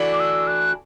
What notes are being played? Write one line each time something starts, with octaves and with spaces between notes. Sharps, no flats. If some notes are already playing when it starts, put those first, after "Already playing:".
Already playing: E3 A3 D4 F#4
D6
E6
F#6